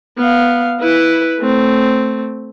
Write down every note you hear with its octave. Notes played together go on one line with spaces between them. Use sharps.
B3 F5
E4 B4
A3 C4